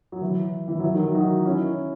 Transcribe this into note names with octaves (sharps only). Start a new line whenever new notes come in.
F#3
E3
E3
F#3
E3
D#3 F#3
D#4 F#4
C#4 E4